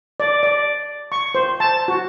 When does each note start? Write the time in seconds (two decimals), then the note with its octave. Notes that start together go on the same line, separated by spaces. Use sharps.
0.20 D5
0.43 D5
1.12 C#6
1.35 C5
1.60 A5
1.88 F#4